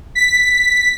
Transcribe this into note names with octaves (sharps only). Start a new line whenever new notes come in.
B6